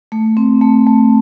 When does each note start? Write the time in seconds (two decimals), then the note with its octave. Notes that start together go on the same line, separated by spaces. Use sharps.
0.12 A3
0.37 C4
0.62 A3
0.87 A3